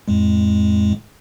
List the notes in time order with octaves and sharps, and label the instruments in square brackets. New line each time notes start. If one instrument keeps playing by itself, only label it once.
[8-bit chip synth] F2 A2 G#3